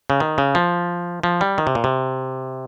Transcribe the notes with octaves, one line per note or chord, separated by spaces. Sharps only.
C#3
D#3
C#3
F3
F3
G3
D#3
C3
A#2
C3